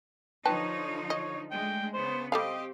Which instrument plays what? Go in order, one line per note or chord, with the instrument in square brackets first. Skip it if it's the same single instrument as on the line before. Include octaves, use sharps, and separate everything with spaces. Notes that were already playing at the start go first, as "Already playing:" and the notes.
[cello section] D3 F3 D#4 [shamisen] B4 G5 A5 [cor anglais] C#5
[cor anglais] C#5 [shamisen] D#5
[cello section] G#3 A3 D4 [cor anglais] G5
[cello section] C#3 B3 [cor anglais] C5
[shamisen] G3 A4 F5 [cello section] C4 G4 [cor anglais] D#5